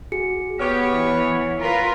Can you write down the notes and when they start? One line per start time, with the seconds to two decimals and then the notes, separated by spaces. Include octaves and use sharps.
0.12 F#4 G#4 C#7
0.59 B3 G4 C#5 F6
0.92 E3
1.61 F4 A#4 B4